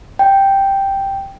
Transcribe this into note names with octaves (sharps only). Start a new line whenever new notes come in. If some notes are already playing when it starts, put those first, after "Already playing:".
G5